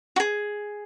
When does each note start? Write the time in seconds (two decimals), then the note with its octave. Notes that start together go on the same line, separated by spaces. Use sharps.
0.16 F#4
0.20 G#4